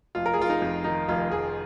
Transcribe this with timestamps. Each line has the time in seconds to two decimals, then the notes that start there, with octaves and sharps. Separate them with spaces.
0.15 F1 F4
0.26 A#4
0.34 G#4
0.38 F1 F4
0.50 D#4
0.62 F2
0.84 D#3 D#4
1.08 F1 F4
1.31 F1 G#4